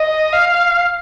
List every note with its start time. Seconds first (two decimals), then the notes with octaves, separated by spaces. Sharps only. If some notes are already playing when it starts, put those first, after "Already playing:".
Already playing: D#5
0.33 F5